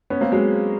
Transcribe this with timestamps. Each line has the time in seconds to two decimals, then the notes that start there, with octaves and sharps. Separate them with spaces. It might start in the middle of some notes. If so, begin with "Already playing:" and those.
0.10 B3 C#4
0.21 A#3 C4
0.32 F#3 G#3